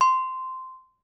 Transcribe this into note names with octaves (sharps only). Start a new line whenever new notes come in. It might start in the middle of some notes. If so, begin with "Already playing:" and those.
C6